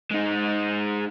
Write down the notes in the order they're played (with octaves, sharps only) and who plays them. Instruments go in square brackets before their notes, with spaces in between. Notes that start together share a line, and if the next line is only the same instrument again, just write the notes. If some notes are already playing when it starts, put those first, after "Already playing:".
[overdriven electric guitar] G#3 D#4